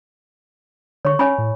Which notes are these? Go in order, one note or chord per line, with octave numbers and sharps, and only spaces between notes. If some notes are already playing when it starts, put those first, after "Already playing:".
D3 C#5 C#6
C#4 C#5 G#5 B5
A2